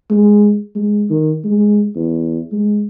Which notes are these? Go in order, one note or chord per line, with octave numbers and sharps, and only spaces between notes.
G#3
G#3
D#3
G#3
E2
G#3